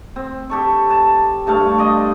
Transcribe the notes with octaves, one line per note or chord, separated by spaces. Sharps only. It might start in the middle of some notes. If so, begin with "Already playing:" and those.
C4
G4 A4 C#6
A5
G2 A3 F5
D5 D#5 C6